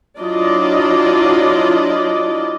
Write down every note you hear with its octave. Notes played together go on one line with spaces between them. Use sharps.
F#3 D4 E4 F4 D5 D#5